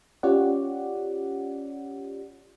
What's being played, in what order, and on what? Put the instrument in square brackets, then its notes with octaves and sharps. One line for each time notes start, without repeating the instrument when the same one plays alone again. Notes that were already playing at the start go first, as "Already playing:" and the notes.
[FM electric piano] C#4 F4 G4 C#5 D5 F#5